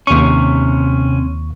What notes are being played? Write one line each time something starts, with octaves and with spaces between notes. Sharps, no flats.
D#2 C3 C#4 C#6